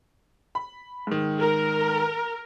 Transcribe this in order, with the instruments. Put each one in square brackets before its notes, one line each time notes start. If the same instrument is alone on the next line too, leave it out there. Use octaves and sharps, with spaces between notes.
[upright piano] B5
G#2 D#3
[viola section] A#4